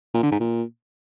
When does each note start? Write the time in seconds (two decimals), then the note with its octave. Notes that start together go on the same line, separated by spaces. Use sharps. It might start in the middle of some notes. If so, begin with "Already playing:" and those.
0.14 A#2
0.23 D3
0.32 G#2
0.40 A#2